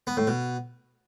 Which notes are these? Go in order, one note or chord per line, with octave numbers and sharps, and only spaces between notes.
B3
A2
B2